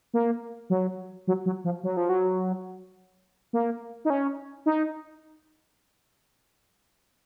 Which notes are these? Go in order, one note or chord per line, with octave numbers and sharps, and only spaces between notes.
A#3
F#3
F#3
F#3
F3
F#3
F3
F#3
A#3
D#4
C#4
D#4